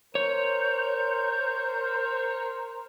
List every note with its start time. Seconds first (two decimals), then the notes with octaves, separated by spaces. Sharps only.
0.15 A#4 C5 C#5 G6